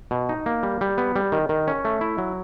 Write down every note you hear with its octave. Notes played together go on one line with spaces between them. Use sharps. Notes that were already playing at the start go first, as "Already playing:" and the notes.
B2
D#4
A#3
G3
G3
B3
G3
D#3
D#3
C#4
A3
E4
F#3